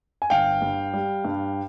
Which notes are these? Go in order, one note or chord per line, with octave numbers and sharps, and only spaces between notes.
G#5
G1 F5 G5
G2
G3
G2